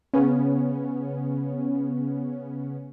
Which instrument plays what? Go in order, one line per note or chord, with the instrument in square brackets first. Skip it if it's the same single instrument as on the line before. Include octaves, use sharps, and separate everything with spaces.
[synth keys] C#3 B3 C#4